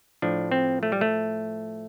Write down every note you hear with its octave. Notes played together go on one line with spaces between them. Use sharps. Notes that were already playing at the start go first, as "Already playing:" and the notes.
A2 F3 D4
C4
A3
G3
A3